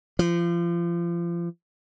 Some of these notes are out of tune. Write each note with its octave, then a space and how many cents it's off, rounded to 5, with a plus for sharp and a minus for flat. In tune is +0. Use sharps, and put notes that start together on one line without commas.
F3 -30